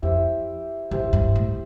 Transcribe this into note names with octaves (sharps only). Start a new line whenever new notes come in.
F2 E4 G4 C5 E5
G2 E4 G4 C5 E5
G2
A2